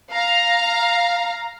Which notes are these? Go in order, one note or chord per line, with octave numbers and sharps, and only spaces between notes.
F5 A#5